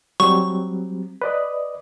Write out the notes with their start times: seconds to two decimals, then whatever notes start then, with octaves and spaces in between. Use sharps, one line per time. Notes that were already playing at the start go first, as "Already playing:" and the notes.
0.20 F#3 G3 C4 C#6
1.22 B4 D5 D#5